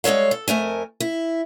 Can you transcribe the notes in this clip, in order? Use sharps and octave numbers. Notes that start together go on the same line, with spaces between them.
G3 G#3 A4 C#5 F5
A4
F2 A3 A#4 G#5
E4